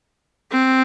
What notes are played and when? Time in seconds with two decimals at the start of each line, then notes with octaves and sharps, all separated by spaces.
0.51 C4